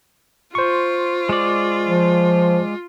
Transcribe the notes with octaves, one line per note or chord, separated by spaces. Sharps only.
F4 C5 C#6
G#3 D5
F3